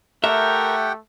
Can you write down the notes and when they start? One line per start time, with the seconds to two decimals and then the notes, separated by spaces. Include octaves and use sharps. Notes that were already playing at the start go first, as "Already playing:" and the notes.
0.24 A3 G4 A#4 E5 F#5 G5